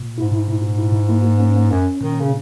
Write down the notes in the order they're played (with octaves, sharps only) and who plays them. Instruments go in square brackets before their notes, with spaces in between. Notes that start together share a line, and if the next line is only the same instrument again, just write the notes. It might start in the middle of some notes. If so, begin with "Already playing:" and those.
Already playing: [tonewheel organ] A#2
[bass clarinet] G#2 [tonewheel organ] E4
[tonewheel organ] A#2
E4
A#3
C#4
[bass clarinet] F#2 [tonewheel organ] C#4
[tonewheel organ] A#2 [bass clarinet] D#3
[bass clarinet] C#3